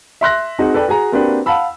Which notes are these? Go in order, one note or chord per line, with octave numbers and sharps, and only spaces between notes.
E5 C6 F#6 A#6
C4 D#4 F#4 G#4
A4 B4 D5 G5 B5
F#4 G#4 G#5 A#5
A#3 C4 D4 F#4 G4 B4
F5 F#5 A5 B5 E6